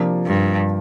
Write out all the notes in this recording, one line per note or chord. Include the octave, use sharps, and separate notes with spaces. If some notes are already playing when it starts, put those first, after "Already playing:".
Already playing: C3 F3 A#3 D4
G2